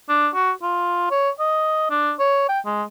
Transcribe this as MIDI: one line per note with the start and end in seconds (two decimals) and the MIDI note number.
0.09 0.29 62
0.34 0.51 66
0.62 1.09 65
1.11 1.30 73
1.39 1.89 75
1.90 2.13 62
2.19 2.46 73
2.49 2.60 79
2.65 2.83 56